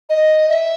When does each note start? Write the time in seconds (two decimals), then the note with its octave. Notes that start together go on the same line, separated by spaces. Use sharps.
0.09 D#5
0.49 E5